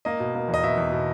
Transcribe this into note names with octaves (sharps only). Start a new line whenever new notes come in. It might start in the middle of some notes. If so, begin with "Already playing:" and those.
A#3 D#5
B2
A#3
E2
D#5
B2 E5
E2
B2